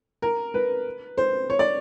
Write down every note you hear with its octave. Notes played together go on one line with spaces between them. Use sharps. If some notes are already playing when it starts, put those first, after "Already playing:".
A#4
B4
C5
C#5
D5